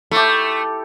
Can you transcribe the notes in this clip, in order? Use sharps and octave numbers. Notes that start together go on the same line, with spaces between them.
A3 E4 G4